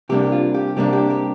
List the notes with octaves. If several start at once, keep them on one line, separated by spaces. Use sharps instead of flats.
C3 G3 A#3 D4 G4
F4
G4
C3 G3 A#3 D4 G4
G4
G4